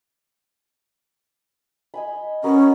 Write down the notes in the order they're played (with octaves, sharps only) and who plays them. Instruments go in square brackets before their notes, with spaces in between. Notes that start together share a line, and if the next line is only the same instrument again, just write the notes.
[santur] D#5 G#5 B5
[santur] B3 F#4 A#4 [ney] C#4